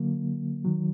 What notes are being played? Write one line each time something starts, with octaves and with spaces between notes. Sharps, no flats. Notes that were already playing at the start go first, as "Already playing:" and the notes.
Already playing: D3 F#3 A#3
D#3 F#3